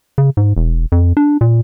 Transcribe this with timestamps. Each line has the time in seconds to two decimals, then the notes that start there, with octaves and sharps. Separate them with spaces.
0.18 C#3
0.37 G#2
0.56 E1
0.92 F2
1.17 D4
1.41 A#2